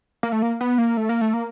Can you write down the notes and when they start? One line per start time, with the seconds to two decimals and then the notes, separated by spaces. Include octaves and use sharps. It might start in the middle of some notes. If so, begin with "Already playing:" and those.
0.23 A#3
0.32 A3
0.42 A#3
0.61 B3
0.78 A#3
0.97 A3
1.09 A#3
1.21 A3
1.34 A#3